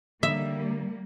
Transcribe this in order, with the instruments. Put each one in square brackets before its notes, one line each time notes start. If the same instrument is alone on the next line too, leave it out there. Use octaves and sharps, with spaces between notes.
[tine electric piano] D3 [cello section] G3 A#3 [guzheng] E5